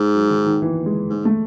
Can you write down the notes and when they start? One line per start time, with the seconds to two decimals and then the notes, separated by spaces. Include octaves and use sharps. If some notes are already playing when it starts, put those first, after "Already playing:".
Already playing: G#2
0.14 F#3
0.29 D#3
0.46 D#3
0.62 E3
0.86 G#3
1.10 G#2 G#3
1.25 A3